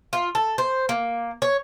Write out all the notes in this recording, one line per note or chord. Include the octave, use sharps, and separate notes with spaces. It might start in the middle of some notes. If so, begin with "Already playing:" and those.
F4
A4
C5
A#3
C#5